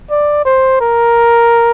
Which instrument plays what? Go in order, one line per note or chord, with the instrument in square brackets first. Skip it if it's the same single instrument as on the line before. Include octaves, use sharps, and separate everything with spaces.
[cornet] D5
C5
A#4